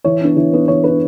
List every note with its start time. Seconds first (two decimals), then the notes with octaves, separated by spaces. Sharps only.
0.04 E3 C#5
0.21 B3 D4
0.37 E3
0.53 B3 D4
0.68 E3 C#5
0.84 B3 D4 B4